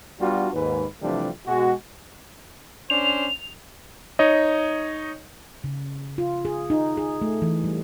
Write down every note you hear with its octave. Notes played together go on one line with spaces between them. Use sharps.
G3 B3 D4 F4 F#4
D#2 G#2 B4
C3 E3 F3 G3 A3 D4
B2 G#3 F#4
C#4 D4 C5 F7
D#4 C#5 D#5
C#3
F4
G#4
D#4
G#4
A3
E3
G3